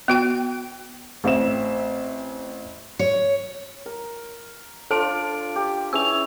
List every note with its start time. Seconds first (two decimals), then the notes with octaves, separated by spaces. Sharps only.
0.08 B3 F#4 G5
1.24 A1 C4 E5 E7
2.99 C#5
3.86 A#4
4.91 D4 F4 A4 A5 D7
5.56 G4
5.93 E3 C#4 G#4 E6 F7